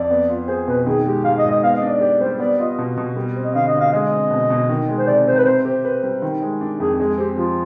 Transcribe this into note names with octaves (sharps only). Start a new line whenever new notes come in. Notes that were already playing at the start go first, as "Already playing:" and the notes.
Already playing: F2 D5
B3
F4
G#4 C5
B2 B4
D#3 G#4
G#3 G4
G#2 F5
D#5
G#2
D#5
B3 F5
D#5
D4
D5
G4 D5
G3 C5
B3 D5
F4 D#5
B2
B2
G3
C4
D#5
D3 F5
D#5
D3
F5
G#3 D#5
C4
B2
B2
D#3
G#3
C5
C3 D5
C3 C5
B4
C4 C5
G4 C5
B4
G3
D#3
G#3
D4
F2 G#4
G#3 G#4
C4 G4
F3 F4